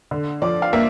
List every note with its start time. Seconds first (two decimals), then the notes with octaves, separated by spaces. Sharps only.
0.11 D3
0.42 F3 D5
0.62 F5
0.73 A#3 E5